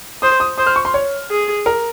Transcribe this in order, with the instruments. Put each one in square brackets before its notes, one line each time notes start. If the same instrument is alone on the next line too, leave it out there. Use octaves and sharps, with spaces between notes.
[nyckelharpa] C5 [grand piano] D#6
[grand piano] D#6
[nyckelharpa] C5 [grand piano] D#6
[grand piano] F6
C#6
C6
C#5
[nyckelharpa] G#4
[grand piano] A#4